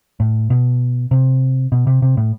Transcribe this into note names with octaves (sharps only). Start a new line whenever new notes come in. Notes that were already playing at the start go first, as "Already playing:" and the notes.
A2
B2
C3
B2
C3
C3
A2